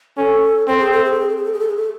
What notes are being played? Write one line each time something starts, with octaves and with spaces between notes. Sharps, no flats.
C#4 A4
C4 A4
G#4
A4
G#4
A4
G#4
A4
G#4
A4
G#4
A4
G#4
A4